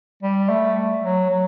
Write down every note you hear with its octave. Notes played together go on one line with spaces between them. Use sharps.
G3
A3
F#3
F#3